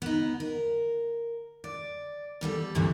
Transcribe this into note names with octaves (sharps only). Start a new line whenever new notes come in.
B3 D#4
A#4
D5
E2 G3 G4 A4
D2 G2 C3 E3